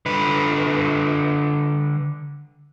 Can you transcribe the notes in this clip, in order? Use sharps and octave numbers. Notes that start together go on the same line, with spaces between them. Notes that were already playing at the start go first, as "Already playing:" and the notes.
D3 B4